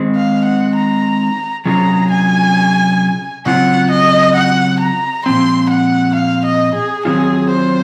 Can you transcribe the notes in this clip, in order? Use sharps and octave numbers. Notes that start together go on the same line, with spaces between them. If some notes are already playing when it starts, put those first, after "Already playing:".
Already playing: D#3 G#3 C4
F5
F#5
A#5
C3 F#3 C#4 F4 G#4 A#5
G#5
C#3 F#3 C4 F4 F#5
D#5
F#5
A#5
A#2 F3 C4 C6
F#5
F5
D#5
G#4
D#3 F#3 C4 F4 G#4
C5